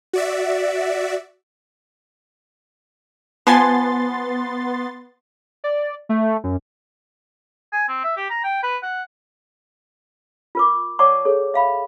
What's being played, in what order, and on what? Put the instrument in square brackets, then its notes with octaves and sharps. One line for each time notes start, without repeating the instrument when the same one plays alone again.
[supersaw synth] F#4 D5 E5
[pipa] F3 G#5 [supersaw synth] B3 C6 A6
[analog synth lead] D5
A3
F#2
[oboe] G#5
C4
E5
G4
A#5
G5
B4
F#5
[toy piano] F4 A#4 D6
C#5 D5 F#5 A5 C#6 D6
G#4 A4 C#5
E5 F5 B5